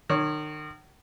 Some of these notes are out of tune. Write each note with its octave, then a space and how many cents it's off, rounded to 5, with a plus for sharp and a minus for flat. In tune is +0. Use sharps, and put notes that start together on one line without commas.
D#3 -40 C#5 +0